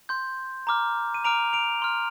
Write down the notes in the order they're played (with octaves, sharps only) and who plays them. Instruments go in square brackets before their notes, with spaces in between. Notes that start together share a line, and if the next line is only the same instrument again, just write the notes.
[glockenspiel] C6 G6
A#5 D6 F6
D#7
A#5 D6 F6 D7 F7
D7 F7
C6 F6